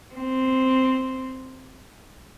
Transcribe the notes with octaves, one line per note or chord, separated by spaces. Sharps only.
C4